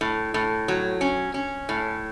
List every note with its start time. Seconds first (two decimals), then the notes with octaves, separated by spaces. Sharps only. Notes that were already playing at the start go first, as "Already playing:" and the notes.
0.01 A2
0.34 A2
0.68 F#3
1.01 C#4
1.34 C#4
1.69 A2